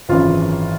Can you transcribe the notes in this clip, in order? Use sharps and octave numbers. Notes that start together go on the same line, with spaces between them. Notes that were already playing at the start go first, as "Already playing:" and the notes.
G#1 F#2 C#3 E3 F4